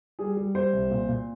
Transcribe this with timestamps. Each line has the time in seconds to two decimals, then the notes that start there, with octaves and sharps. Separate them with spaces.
0.19 G3 G#4
0.37 G3
0.55 G3 C5
0.73 C2
0.91 A#2
1.09 A#2